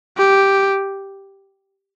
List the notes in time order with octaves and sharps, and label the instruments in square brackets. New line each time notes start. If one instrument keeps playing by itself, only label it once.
[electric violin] G4